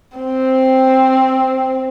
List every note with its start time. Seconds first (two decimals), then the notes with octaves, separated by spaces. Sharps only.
0.17 C4